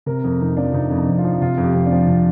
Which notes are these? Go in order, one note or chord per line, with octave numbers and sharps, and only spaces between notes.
C3 A#4
F2
F2 D#4
F3 D4
C3 D#4
F2
D#4
F2
F4
F3
C3 F4
F2
G4
F2
D4
F3
C3